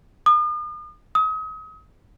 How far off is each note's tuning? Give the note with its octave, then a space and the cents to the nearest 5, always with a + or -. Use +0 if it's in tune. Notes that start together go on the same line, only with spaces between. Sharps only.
D#6 -45
D#6 +35